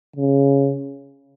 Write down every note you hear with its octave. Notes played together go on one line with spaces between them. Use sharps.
C#3